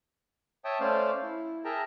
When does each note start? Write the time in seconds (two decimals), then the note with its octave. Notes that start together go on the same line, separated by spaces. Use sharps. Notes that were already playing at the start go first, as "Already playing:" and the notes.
0.65 C#5 E5 G5 A5 D#6
0.80 A3 C#4 C5 D5 F5
1.23 E4
1.65 G#4 A#4 E5 G5 A5 A#5